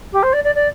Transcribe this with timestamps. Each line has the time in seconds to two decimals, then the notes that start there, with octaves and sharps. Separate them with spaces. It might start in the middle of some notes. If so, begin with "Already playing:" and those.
0.12 G4
0.22 C5
0.33 D5
0.44 D5
0.55 D5